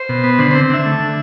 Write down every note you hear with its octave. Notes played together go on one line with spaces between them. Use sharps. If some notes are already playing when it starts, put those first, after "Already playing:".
Already playing: C5
B2
B3
D3 C5
C4 C5
D3 E5
A3
D3